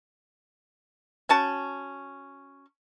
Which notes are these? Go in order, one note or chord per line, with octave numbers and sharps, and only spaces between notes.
C#4 F#4 A5